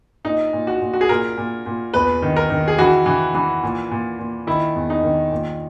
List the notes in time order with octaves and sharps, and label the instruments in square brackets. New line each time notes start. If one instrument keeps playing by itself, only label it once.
[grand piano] A#2 D#4
A#2
F#4
A#2
F#4
G#4
A#2 A#4
A#2
A#2
E2 B4
D#3
A#4
D#3
G#4
E3 F#4
E3
E3
A#2
A#2
A#2
D#3 E4
E2
D#4
D#3
A#2